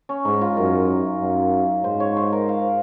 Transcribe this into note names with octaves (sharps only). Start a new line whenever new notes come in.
C#4
G#2 D#4
F4
F#2 A#4
F#2
G#2 C5
C#5
C5
A#4
F5